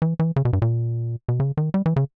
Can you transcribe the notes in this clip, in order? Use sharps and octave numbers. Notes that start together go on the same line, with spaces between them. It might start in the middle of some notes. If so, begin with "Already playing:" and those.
E3
E3
C#3
B2
G2
A#2
B2
C#3
D#3
G3
E3
C#3